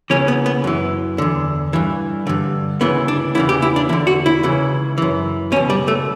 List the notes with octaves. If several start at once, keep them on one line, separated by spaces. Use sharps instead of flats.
C#2 C#3 E3 C#4
B3
B3
F#2 E3
E2 D3
G2 E3
G2 D3
D2 C#3 E3 B3
D4
E2 C#3 E3 E4
G4
E4
D4
E2 D3 E4
F#4
E4
C#2 C#3 E3
F#2 E3
C#2 B2 C#4
G3
A3